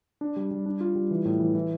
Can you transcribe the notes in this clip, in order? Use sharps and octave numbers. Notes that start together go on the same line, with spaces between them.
D4
G3
G3
D4
F4
G3
E3
A2
E3
E3